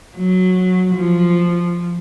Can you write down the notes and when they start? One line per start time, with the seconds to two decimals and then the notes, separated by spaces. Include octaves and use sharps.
0.16 F#3
0.95 F3